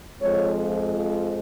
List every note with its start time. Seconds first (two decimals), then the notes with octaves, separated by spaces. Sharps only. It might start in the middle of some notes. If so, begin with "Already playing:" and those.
0.20 F2 F3 G#3 C#5